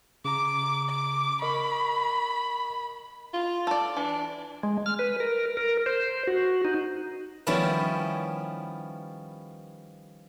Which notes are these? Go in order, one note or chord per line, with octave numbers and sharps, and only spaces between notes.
C#3 A#5 D6
D6
A#4 D#5 B5 C#6
F4
A4 D5
E3 D4
G#3
F6
B4
A#4
A#4
C5
F#4
D#4
D#3 F3 G3 B3 C#4 E4